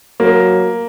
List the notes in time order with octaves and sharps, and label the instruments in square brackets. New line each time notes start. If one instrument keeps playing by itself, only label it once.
[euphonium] F#3 [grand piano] A#3